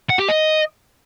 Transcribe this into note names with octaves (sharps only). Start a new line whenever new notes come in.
F#5
G4
D#5